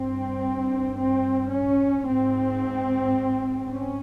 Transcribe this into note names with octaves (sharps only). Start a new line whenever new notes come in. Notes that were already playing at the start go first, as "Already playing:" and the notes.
Already playing: G2 C4
C4
C#4
G#2 C4
C#4